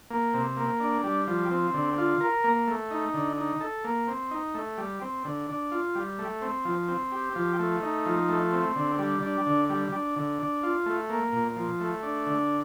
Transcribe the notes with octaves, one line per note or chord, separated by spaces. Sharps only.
A#3
C3
A#3
D4
G3
F3
C4
D3
F4
A#4
A#3
A3
D#4
D3
D#4
A4
A#3
C4
D#4
A3
G3
C4
D3
D4
F4
G3
A3
C4
F3
C4
G4
F3
A3
D#4
F3
A3
C4
D3
G3
D4
D3
G3
D4
D3
D4
F4
A3
A#3
A#2
F3
A3
D4
D3